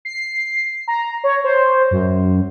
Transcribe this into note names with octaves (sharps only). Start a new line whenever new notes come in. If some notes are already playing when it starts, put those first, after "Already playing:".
C7
A#5
C#5
C5
F#2